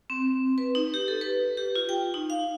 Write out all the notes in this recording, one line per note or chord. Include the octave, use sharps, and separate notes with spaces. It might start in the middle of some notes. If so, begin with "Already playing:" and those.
C4
B4
D#4
G4
A4
B4
G4
F4
G5
D#4
F5